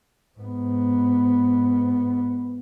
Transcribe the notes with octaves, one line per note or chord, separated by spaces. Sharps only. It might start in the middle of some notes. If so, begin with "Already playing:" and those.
G#2 B3